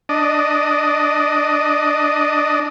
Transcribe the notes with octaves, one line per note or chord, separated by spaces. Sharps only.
D4 D#5